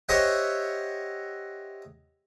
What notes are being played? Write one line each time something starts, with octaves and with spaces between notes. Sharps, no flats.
G4 C5 C#5 D#5 E5 F#5